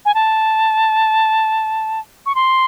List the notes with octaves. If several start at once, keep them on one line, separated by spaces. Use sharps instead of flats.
G#5
A5
C#6
C6